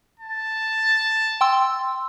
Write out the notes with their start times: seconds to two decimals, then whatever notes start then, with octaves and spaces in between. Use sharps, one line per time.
0.20 A5
1.41 G5 C6 E6